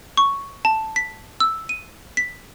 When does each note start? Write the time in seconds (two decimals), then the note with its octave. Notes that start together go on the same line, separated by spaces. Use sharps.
0.17 C#6
0.65 A5
0.96 B6
1.40 E6
1.69 D#7
2.17 B6